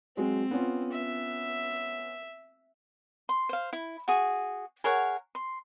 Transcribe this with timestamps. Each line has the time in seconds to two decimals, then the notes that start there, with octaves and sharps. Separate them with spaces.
0.17 F#3 G#3 C4
0.51 B3 C#4 F4
0.93 E5
3.29 C6
3.49 C5 F5
3.73 E4
4.08 F#4 G#4
4.84 G#4 A#4 C#5 F#5
5.35 C6